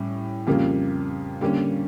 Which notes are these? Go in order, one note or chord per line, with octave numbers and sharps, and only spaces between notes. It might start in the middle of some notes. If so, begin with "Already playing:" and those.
Already playing: A2 G3 C#4
F2 C#3 G3 A#3
D3 G3 A#3 C#4